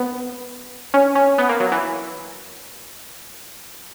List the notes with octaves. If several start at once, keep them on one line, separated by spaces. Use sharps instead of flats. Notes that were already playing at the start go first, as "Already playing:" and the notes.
Already playing: B3
C#4
C#4
B3
A#3
F#3
E3